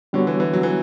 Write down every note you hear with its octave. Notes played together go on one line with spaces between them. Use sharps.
D3 G3 B3 F#4 C#5
E3
E3
F#3
E3